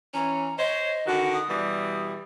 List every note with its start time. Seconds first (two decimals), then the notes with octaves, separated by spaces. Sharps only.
0.14 E3 C#4 A#5
0.58 C5 C#5 D#5
1.06 D3 D#3 F#4
1.33 D#6
1.49 B2 E3 G3